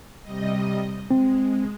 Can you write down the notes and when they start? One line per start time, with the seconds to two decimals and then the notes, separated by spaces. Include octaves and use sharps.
0.22 C3 G3 D#5
1.11 G#3 C4